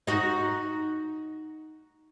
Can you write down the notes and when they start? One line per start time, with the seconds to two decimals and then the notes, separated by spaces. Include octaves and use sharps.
0.07 D#4 F#4